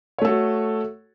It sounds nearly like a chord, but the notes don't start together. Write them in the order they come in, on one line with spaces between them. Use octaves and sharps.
C#5 A3 A4 F#4